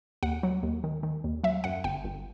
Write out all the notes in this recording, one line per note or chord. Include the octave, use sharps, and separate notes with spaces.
D#2 F#5
F#3
D#2
D#3
D#3
D#2
F#3 E5
F#2 F#5
G1 G5
G1